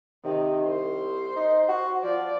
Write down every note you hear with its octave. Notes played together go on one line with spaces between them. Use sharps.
C3 D#3
C2 C5
D#4
F#4
F3 D5